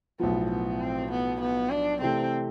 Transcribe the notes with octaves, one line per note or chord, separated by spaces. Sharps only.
B1 A2 F3 B3
B3
C4
B3
B3
D4
C3 E3 A3 C4